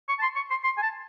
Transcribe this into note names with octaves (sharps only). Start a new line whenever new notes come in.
C#6
A5
C6
C#6
C6
C6
G#5
A5